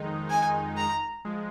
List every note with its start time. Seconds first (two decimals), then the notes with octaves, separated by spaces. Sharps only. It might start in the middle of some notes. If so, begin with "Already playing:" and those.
Already playing: F2 D#3 G#3 D#4
0.30 G#5
0.77 A#5
1.25 F3 G#3